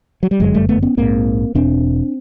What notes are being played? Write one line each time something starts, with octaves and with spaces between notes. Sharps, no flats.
F#3
G3
G1 F#2 D3 F#3 G#3
G3 A3
A3 B3
B3 C#4
A#1 G#2 A#3 C4
E1 E2 B2 C4 D4